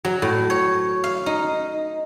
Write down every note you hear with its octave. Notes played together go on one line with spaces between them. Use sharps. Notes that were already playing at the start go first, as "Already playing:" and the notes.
F#3
A2
C#5
F5
D#4